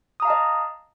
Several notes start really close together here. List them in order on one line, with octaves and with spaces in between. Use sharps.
D#6 A#5 F5 A5 D#5